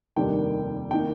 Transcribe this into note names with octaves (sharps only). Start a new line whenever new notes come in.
F1 D#2 D#3 G3 D4 G5
D#3 A#3 D#4 G5